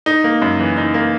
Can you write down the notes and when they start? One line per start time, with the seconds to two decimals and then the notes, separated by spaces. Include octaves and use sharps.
0.06 D#4
0.24 A#3
0.42 F#2
0.60 E3
0.77 D#4
0.94 A#3